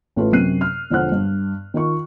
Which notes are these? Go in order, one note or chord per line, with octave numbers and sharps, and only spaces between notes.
A1 A3 F4 B4
F#2 C3 C#4 F#6 C7 D#7
F6
E1 D3 F3 C5 F#5 F#6
G2
D#3 F4 C#6